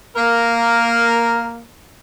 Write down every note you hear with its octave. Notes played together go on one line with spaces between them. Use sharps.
A#3 A#4